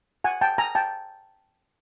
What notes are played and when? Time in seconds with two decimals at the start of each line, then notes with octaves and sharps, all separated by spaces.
0.24 F#5 G#5
0.41 G5 A5
0.58 G#5 A#5
0.75 G5 A5